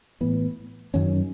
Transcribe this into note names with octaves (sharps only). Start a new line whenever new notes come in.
A2 E3 B3
F#2 D#3 F#3 C#4